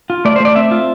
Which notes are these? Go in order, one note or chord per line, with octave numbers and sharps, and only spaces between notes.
F4
A3 D5
C5
A3 D5
C4 E5
F4